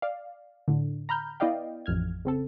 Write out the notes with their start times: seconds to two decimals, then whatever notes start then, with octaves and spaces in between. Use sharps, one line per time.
0.02 D5 F5
0.68 A2 D3
1.09 A#5 B5 F6 G6
1.40 B3 E4 D5 D#5 F5 G5
1.86 A1 F2 F6 G#6
2.25 C#3 C4 A4